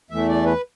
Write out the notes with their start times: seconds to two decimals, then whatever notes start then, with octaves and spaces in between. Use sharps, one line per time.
0.10 E2 E3 A3 E5
0.29 D5
0.46 B4